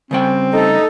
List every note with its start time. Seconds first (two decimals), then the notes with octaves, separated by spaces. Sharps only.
0.11 C#3 G3 C4 G5
0.53 G2 A3 D#4 A4